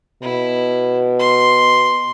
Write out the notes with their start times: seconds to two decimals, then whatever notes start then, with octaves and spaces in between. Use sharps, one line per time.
0.23 B2 E4
1.19 C6